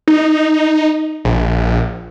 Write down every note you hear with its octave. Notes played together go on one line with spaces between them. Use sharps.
D#4
A#1